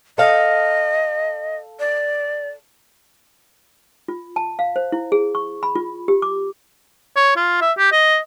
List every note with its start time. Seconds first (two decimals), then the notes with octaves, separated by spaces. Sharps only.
0.18 A4 D#5 F5
1.80 D5
4.08 F4
4.36 A5
4.59 F5
4.76 C5
4.92 E4
5.12 G#4
5.35 C#6
5.63 B5
5.76 F4
6.08 G4
6.22 D6
7.16 C#5
7.36 F4
7.61 E5
7.78 G4
7.92 D#5